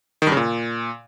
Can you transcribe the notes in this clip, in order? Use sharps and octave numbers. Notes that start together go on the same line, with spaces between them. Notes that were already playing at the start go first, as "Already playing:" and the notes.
D#3
G2
C#3
A#2